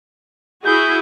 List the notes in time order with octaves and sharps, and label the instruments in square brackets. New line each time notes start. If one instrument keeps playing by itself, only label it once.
[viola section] E4 F#4 G#4 [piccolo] G6